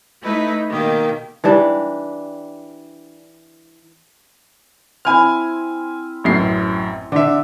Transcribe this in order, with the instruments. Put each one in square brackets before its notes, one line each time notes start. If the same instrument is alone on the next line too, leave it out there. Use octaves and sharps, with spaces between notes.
[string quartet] A3 D#4 E4 B4 E5
B2 D#3 A#3 G4
[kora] E3 G3 D4 G4
[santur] C4 E4 [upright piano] G#5 F6
[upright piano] A1 F#2 C7
[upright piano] D3 E5 [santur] D5